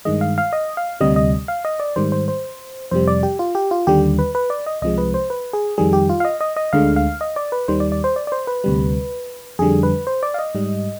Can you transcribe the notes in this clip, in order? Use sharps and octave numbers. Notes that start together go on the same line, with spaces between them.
G2 D#3 G#3 D#5
F5
F5
D#5
F5
D2 C3 G3 D#5
D#5
F5
D#5
D5
G#2 D#3 G3 C5
C5
C5
F2 C3 G3 C5
D5
G4
F4
G4
F4
D#2 D3 G3 G4
B4
B4
D5
D#5
C2 C3 F3 G#3 D#5
B4
C5
B4
G#4
F2 D#3 G3 G#4
G4
F4
F5
D#5
D#5
D#5
D2 D3 G#3 F5
F5
D#5
D5
B4
D#2 D#3 G3 C5
D5
D5
C5
D5
D5
C5
B4
D2 C3 G3
F2 D3 G3 G#4
B4
C5
D5
F5
D#5
G#2 G3